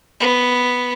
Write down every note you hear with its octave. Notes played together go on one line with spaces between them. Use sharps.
B3